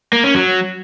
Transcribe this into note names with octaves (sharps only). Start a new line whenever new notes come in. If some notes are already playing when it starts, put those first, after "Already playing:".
A#3
C#4
F#3